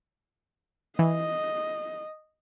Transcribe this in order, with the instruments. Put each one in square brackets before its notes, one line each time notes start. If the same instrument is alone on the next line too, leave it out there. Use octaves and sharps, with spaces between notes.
[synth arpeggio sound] E3 [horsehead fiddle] D#5